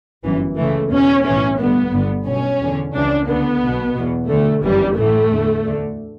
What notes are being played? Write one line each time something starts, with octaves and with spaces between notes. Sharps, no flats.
G1 F#2 E3
C#2 C#3 E3 A3
E2 B2 C#4
B1 A2 E3 C#4
A1 G2 D3 B3
G1 G2 D3
B1 B2 C#4
E2 D3
C#2 C#3 E3 D4
D2 D3 B3
B1 B2
E2 B2
D2 D3 A3
G1 F#2 E3 G3
A1 A2 E3 A3
E2 D3
D2 D3